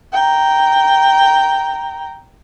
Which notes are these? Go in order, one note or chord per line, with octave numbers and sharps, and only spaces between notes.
G5 A#5